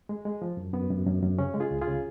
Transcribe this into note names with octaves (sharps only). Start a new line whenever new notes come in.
G#3
G#3
F3
F#2
F#2 B3
F#2
F#2
F#2
C#3 C#4
G#3
F4 G#4
C#2
F4 G#4
C#3